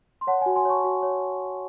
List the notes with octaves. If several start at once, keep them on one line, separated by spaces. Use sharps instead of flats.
C6
C#5 F#5 A5
F#4 G#5
G#5 C6
C#5 A5 C#6
F#4
C#5